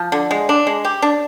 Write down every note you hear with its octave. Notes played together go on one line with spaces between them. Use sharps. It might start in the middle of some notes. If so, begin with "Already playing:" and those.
Already playing: F3
D3
G#3
D4
G#3
G4
D4